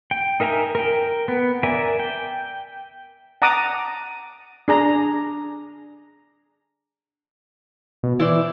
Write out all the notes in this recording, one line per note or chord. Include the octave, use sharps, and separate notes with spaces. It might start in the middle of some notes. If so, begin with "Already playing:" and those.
G5
D#4 A#4 E5 G#5 A#5
A#4 G5
B3
A#4 D5 E5 G#5
G5
F#5 A5 A#5 D6 D#6
D4 G#4 A#5
B2
E3 E4 C5 D5